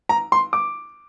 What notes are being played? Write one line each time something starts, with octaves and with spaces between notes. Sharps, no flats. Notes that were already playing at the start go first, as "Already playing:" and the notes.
A#5
C6
D6